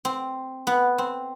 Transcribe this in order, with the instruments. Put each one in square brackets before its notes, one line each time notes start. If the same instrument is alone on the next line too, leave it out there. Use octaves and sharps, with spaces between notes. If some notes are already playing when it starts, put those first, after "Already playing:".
[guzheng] C4
B3
C4